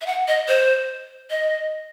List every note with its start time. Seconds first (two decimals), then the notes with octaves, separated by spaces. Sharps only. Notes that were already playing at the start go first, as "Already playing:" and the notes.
0.01 E5
0.06 F#5
0.28 D#5
0.48 C5
1.30 D#5